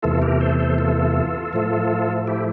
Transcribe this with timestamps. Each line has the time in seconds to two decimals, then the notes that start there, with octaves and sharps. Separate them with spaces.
0.03 E2 C3 E3 A3 F4 A4
0.22 G4 A#4
0.40 A4 C5
0.59 A4 C5
0.78 F4 A4
1.53 A2 F3 A3
2.27 E4 G4